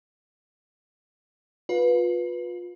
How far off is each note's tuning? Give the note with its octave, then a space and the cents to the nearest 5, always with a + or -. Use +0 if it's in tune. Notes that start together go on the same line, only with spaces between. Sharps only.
F4 +30 B4 -10